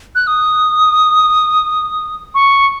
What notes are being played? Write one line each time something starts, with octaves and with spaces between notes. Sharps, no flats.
F#6
D#6
C#6